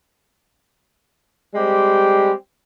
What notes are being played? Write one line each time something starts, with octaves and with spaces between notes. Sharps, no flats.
G3 G#3 C4 G4